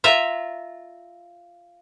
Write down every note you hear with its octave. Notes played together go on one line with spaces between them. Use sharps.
F4 E5 A#5